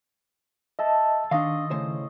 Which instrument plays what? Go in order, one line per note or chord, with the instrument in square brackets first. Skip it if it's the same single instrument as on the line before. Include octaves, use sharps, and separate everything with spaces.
[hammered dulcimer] A4 [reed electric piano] D#5 E5 A5
[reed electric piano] D#3 [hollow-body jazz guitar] D4 F5 [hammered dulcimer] D#5 C6 C#6
[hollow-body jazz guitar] A2 C#3 C5